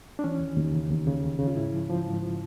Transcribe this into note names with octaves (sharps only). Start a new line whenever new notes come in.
D4
E3 C#4
D#2
D#2
C#3
D#2
C#3
D#2
C#3
F4
G#2 E4
F3
F3
G#2
F3